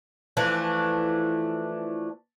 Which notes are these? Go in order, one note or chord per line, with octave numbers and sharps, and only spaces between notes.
E3 F3 A3 D4